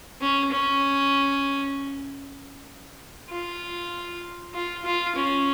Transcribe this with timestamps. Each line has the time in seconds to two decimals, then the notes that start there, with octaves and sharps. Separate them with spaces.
0.21 C#4
0.51 C#4
3.30 F4
4.54 F4
4.85 F4
5.16 C#4